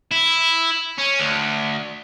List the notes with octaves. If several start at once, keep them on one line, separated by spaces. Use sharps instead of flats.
E4
C#4
D2